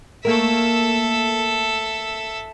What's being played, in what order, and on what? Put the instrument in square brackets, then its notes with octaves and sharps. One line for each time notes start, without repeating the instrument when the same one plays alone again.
[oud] A3 A#3 A#4 [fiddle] A4 E5